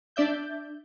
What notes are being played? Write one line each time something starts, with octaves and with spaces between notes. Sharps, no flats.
D4 D5 E5 G6